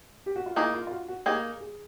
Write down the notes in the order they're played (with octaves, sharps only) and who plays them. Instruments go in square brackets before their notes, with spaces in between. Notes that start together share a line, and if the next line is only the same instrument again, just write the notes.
[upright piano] G4
F#4
F4
[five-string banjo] A#3 D#4 G#4 [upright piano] E4
[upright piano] F4
F4
F#4
F#4
[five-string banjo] A#3 D#4 G#4 [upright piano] G4
[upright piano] G#4